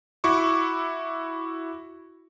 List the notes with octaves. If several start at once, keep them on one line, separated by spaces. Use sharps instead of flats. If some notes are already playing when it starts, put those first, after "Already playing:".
E4 F#4 C#6 D6